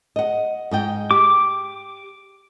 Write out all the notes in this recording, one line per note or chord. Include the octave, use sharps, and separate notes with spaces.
D#5 F#5
G#2 D#5 G5
G4 D6